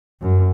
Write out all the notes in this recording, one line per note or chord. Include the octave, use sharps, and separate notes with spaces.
F#2